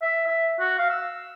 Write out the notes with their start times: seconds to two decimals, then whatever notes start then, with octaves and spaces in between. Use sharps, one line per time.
0.02 E5
0.27 E5
0.60 F#4
0.78 F5
0.90 E6